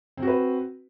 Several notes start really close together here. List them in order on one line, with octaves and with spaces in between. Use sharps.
C4 F#4 B4